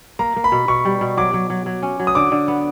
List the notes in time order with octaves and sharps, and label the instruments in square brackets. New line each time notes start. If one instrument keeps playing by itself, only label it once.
[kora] A#3 [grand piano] A#5
[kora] A#3
[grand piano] B5
[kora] B2
[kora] B2 [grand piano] C#6
[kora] G3
B2
[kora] F#3 [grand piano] D6
[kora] F#3
F#3
F#3
C#4
F#3
[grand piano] D#6
[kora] D3 [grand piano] D6
[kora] D3
B3